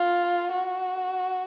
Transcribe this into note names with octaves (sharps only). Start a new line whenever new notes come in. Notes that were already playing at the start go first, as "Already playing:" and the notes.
Already playing: F4
F#4